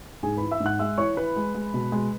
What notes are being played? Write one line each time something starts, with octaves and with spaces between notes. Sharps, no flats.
G#2 G#4 G#5
E3 B4 B5
E5 E6
G#2
F#5 F#6
G#3 E5 E6
E3 C#5 C#6
E3 B4 B5
G#3
G#3
B2
G#3